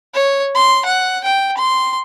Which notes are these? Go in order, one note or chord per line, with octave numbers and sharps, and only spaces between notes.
C#5
C6
F#5
G5
C6